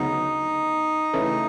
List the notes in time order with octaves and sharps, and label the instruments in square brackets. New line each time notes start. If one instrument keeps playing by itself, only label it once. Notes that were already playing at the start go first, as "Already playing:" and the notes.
Already playing: [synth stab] D2 C#3 F#3 B3 [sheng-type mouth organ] D#4
[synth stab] C#3 E3 A3